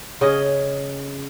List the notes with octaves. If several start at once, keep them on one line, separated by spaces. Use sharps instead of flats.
C#3 G#4 D#5